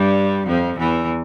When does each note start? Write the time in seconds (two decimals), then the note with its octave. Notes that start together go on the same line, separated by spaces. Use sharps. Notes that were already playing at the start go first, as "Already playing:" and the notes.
Already playing: G2 G3
0.47 F2 F3
0.79 E2 E3